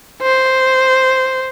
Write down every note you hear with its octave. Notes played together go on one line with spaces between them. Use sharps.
C5